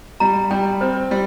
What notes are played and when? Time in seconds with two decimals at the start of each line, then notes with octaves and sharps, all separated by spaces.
0.20 G3 A#5
0.51 G3 G5
0.81 C4 C5
1.11 G3